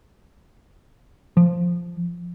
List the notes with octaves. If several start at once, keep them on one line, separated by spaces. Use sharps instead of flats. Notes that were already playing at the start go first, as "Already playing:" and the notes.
F3